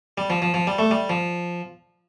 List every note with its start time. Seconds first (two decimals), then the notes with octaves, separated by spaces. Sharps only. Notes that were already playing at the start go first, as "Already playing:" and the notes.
0.18 G3
0.30 F3
0.42 F3
0.54 F3
0.67 G3
0.79 A3
0.91 G3
1.10 F3